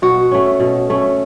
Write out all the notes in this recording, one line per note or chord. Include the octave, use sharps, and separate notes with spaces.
B2 F#4
A3 C#4
B2
A3 C#4